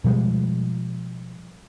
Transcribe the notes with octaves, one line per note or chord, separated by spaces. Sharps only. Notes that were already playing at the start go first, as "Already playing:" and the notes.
B2 F3 G3 G#3